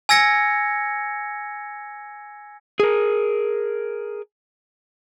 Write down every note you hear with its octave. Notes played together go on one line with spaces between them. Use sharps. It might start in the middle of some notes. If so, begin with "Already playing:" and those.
G#5 E6 G#6 A#6 C#7
G#4 A#4